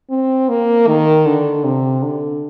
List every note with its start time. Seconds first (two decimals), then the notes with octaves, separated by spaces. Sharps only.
0.10 C4
0.49 A#3
0.87 D#3
1.26 D3
1.64 C3
2.03 D3